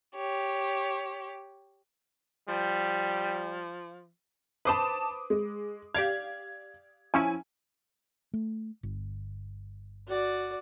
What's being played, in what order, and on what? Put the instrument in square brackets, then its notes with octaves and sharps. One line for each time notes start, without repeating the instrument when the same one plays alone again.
[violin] G4 C#5
[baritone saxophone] F3 [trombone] G3
[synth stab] B4 C5 B5 [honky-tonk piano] A5 D6 D#6
[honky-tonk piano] G#3
[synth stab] G4 D5 F5 [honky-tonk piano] G#6
[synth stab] F3 C#4 E4 [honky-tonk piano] G#5
[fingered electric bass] A3
G1
[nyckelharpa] F#4 D5